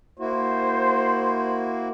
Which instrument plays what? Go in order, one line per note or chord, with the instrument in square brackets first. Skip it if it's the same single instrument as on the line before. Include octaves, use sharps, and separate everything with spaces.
[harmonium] A#3 E4 F#4 [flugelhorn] C5